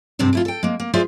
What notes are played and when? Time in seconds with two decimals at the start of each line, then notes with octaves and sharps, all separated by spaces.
0.19 G2 C3 B3 C4 D4
0.33 A3 E4 F4
0.45 A4 G5
0.63 G#3 A#3
0.80 A#3
0.93 E4 F4 G#4 C5 D5 E5